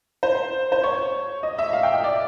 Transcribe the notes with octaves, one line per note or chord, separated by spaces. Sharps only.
C5
C5
C#5
D#5
E5
F5
G5
D#5
D5